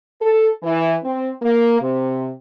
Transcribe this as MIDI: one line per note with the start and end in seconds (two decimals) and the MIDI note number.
0.22 0.49 69
0.63 0.94 52
1.03 1.30 60
1.42 1.80 58
1.80 2.30 48